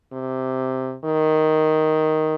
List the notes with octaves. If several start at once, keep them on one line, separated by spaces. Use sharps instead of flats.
C3
D#3